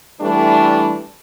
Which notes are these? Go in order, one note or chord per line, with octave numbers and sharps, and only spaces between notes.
E3 G3 A3 D4